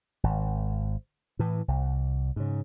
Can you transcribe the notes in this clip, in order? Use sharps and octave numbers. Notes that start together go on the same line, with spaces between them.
G#1
A2 E3
C2
G#2 C#3